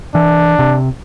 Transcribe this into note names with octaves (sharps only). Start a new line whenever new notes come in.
E3 D4
C3